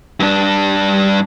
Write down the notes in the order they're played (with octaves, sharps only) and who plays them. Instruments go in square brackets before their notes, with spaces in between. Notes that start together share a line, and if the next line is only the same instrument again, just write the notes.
[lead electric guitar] G2 D4